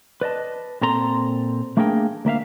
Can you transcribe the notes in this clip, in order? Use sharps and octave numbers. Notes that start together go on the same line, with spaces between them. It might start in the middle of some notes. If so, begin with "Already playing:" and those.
B4 D5 D#5 A5
A#2 C4 A4 A#5 C6
A3 A#3 D4 G#4 A#4 G5
D2 A#3 E5 F5